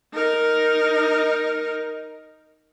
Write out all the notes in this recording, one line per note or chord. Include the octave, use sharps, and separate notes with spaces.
D#4 A#4